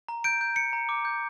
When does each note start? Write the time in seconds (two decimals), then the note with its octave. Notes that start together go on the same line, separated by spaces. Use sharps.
0.09 A#5
0.24 G6 D7
0.41 G6
0.56 G6 C#7
0.73 A#5
0.89 D6
1.05 G6